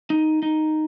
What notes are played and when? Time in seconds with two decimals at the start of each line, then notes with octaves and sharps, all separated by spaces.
0.10 D#4
0.43 D#4